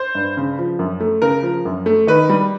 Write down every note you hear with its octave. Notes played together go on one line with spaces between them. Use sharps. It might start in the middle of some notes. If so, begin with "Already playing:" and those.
Already playing: C5
G2
C#3
F3
F#2
A3
C#3 A#4
F3
F#2
A3
D#3 B4
G3